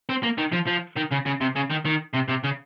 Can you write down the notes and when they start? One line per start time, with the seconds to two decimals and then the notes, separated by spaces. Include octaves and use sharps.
0.09 C4
0.23 A#3
0.38 D#3
0.53 F3
0.67 F3
0.97 D#3
1.12 C#3
1.26 C#3
1.41 C3
1.56 C#3
1.71 D#3
1.86 D#3
2.14 C3
2.29 C3
2.44 C#3